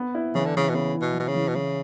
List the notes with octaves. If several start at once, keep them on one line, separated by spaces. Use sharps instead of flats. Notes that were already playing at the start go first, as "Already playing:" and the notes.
Already playing: B3
E4
C#3 E3
D3
C#3 E3
B2
C#3 B3
E4
B2
B2 E3
C#3
E3
B2
C#3 E3